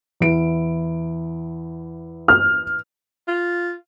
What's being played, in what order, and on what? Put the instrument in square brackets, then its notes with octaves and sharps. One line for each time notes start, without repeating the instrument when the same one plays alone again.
[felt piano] E2 E4 D7
[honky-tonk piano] F6
[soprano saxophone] F4